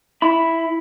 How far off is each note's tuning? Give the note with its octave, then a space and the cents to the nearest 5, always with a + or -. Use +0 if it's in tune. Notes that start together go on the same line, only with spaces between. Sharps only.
E4 +0 B5 +0